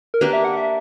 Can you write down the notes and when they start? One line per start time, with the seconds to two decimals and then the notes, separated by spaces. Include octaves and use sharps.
0.14 A#4
0.21 A#3 D4 G4 B4
0.33 E5
0.44 F#5
0.57 E5